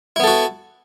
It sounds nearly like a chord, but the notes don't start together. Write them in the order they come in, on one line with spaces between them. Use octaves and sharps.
E4 B3 A4 F#4